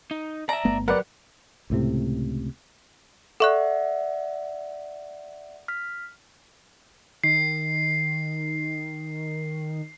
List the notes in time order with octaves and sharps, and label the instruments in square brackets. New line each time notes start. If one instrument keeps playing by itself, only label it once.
[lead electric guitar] D#4
[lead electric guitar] D5 E5 [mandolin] A#5
[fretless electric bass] G1 A3 B3
[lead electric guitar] F#3 G4 [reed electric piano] A#4 B4 D5 [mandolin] F#5
[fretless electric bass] C#2 A2 C3
[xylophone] A4 C#6 F#6 [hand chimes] D5 E5 F#5
[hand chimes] F6 B6
[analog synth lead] D#3 [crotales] C7